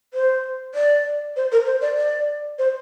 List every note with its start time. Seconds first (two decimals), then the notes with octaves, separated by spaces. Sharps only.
0.14 C5
0.75 D5
1.36 C5
1.52 A#4
1.66 C5
1.82 D5
1.97 D5
2.59 C5